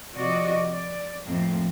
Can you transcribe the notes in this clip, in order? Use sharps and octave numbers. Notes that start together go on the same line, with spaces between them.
C3 F3 F#4 D5 D#5
D5
F2 A2 A#3 C4